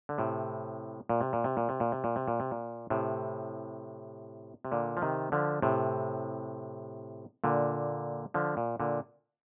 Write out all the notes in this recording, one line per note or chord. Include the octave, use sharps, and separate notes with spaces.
D3
A2 C3
A#2
C3
A#2
C3
A#2
C3
A#2
C3
A#2
C3
A#2
C3
A#2
A2 C3
C3
A#2 D3
F3
C3 D#3
D3 F3
A2 C3
A#2 D3
D3 F3
A#2
A#2 D3